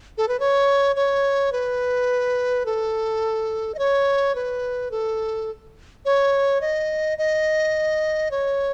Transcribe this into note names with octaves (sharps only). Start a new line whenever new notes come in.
A4
B4
C#5
C#5
B4
A4
D#5
C#5
B4
A4
C#5
D#5
D#5
C#5